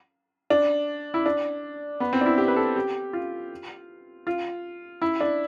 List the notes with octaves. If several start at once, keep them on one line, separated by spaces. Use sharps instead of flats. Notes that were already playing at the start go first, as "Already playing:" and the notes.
D4
E4
D4
B3
C4
D4
E4
G4
B4
A4
G4
F4
F4
E4
D4